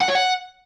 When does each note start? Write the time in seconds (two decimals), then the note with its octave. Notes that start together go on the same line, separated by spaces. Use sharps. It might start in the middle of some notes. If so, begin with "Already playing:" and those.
0.01 F#5
0.08 C#5
0.15 F#5